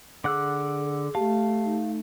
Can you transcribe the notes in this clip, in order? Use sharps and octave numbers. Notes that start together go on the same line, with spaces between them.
D3 G#4 F#5 D6 E6 F#6
A3 G4 F5 A5
D#4